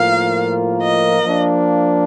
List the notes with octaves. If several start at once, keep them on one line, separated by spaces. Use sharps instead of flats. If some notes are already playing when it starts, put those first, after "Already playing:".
Already playing: A2 F3 A#3 F4 A#4 F5
D#5
F3 A#3 D4